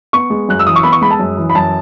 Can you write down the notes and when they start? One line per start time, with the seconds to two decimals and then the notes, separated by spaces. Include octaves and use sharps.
0.13 B3 C#6
0.30 G#3
0.49 F#2 F#6
0.59 E6
0.66 E3 D#6
0.76 C#6
0.83 B3 B5
0.92 C#6
1.01 G#3 B5
1.10 A5
1.19 F#2
1.37 E3
1.50 B5
1.55 F#2 A5